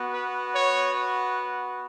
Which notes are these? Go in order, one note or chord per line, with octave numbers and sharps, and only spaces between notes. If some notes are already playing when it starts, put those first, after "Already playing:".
Already playing: B3 F#4
B4
C#5